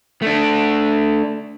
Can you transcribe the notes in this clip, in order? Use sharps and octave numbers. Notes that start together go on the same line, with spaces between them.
A3 D4